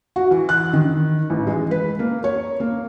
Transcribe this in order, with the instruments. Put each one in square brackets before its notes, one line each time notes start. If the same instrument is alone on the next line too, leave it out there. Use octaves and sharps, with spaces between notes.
[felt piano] F#4
E3
F#6
D#3
A1
G#3
B4
A#3
C#5
A#3